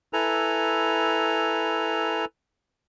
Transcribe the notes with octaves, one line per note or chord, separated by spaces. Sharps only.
E4 A4 B4 G#5 A#5